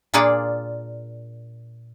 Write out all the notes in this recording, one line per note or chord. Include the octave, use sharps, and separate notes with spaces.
A#2 A#3 D4 F4 G#4 D5